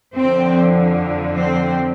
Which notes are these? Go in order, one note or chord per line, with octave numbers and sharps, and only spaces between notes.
F2 D3 F3 C4
C4